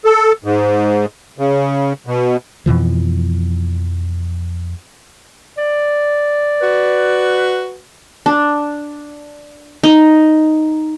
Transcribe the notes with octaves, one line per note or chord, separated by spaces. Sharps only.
A4
G#2
C#3
B2
F2 B2 E3 F3
D5
F#4 B4
D4
D#4